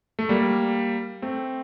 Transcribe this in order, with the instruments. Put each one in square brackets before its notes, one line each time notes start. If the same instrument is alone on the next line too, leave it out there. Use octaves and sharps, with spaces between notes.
[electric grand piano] A3
G3 A#3
A3 C4